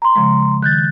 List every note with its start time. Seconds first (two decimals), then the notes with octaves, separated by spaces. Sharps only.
0.02 A#5 C6
0.16 C#3 F3 G#3
0.62 D#3 F#6 G6 A6